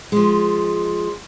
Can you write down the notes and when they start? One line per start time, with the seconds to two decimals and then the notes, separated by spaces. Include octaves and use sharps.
0.12 F3 G#3